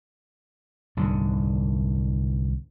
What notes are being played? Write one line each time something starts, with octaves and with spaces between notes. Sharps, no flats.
C2 G#2 D3